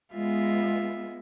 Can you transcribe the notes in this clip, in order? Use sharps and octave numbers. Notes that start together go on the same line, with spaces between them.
G#3 B3 F4 E5